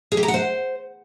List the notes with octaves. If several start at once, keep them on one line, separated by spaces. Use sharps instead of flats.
G#4
G4
A#5
F#5
C5